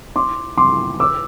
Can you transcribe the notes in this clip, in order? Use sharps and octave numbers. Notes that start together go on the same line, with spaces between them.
C6 D6
C6 D6
D6 E6